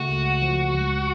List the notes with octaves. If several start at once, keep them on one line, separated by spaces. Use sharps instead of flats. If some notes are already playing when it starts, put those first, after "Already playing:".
Already playing: C#3 A3 F#4
C#2
F3
C#2